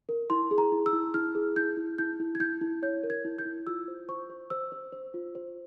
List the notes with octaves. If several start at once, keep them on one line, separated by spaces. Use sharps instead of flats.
A#4
E4 C6
G#4
A#5
E4
E6
E4
E4 F6
G#4
E4 G6
E4
E4 G6
E4
G#6
E4 G6
E4
C#5 G6
A#4
G#6
E4
G6
E4
F4 E6
C5
C5 C#6
C5
C5 E6
C5
C5
F4
C5